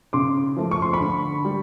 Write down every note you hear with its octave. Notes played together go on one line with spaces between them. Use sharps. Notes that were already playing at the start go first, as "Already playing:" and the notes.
C#3 C6 D6
F3 A3
C#6
C6
B5 C#6
D3
G3